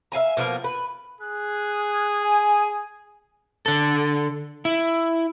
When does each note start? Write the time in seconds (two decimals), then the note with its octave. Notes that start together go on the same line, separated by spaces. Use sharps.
0.12 E5 F5 G#5 A#5
0.37 B2 F3 A#3 A#4
0.64 B4
1.21 G#4 F#6
2.23 G#5
3.66 D3 A4
4.65 E4